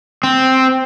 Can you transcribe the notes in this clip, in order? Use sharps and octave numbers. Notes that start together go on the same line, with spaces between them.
C4